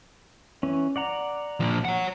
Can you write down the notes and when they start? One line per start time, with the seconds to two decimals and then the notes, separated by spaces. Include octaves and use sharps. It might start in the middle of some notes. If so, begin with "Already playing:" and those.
0.63 E3 C#4
0.96 D5 F#5 A#5
1.60 A#2 F3
1.85 C#5 F#5